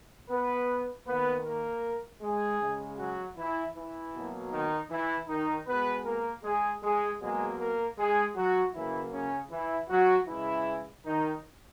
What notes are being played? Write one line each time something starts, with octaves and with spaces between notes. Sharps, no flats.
B3 B4
D#3 A#3 B3 B4
A#3 A#4
G#3 G#4
C#3 G#3
F#3 F#4
E3 E4
E3 E4
B2 F#3 A#3
D#3 D#4
E3 E4
D#3 D#4
B2 G#3 B3 B4
A#3 A#4
G#3 G#4
G#3 G#4
B2 F#3 G#3 A#3 G#4
A#3 A#4
G#3 G#4
F#3 F#4
C#3 E3 F#3 A#3 E4
C#3 C#4
E3 E4
F#3 F#4
C#3 E3 G#3 E4
D#3 D#4